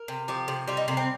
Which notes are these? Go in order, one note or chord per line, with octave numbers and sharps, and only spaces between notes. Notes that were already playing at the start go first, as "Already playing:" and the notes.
Already playing: A#4
C3
F3 G4
C3
G3 F4
D#4
C3 A#3
C4